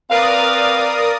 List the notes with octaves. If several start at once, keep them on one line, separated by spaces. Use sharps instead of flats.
C4 A#4 B4 D5 F5 D#6